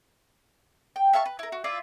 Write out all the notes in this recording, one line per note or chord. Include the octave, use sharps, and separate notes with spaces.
G5
E5 F5 A5 C#6
B4
E4 A#4
F#4
E4 F4 D5 E5